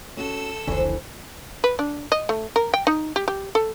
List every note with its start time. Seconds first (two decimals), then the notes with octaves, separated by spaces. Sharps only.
0.17 C#4 F#4 A4 E6
0.67 F1 C#2 D3 E3 D4 C5 C#5
1.64 B4
1.79 D4
2.12 D#5
2.29 A3
2.56 A#4
2.74 G5
2.87 D#4
3.16 G4
3.28 G4
3.55 A4